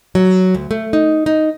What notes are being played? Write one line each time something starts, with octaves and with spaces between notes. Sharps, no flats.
F#3
D2
A3
D#4
D#4